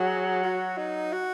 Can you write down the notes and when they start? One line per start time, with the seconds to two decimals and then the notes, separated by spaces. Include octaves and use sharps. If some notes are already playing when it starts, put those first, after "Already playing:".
Already playing: F#3 G#4
0.43 F#4
0.77 D#4
1.13 F#4